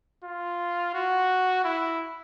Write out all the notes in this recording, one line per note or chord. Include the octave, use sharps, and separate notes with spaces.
F4
F#4
E4